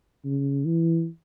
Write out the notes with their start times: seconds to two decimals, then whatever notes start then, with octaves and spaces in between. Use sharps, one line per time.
0.25 C#3
0.65 E3